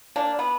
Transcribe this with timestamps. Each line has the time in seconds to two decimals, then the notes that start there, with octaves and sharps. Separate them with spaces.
0.16 A#3 D4
0.39 B3